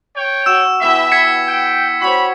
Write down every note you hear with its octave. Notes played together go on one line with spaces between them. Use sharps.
C#5 G5
F#4 E6 E7
E3 B3 E4 G4 E5
G#6 B6 C#7
G5
F#4 C5 C#5 B5